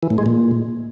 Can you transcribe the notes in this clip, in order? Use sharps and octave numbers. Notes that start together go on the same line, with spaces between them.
E3
A2
G#3
A#2